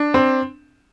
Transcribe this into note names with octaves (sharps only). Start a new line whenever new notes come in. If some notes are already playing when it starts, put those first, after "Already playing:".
Already playing: D4
C4